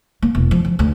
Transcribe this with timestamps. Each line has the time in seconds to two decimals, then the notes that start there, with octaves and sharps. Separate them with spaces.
0.22 A#3
0.35 E1
0.51 F3
0.65 F3
0.79 D2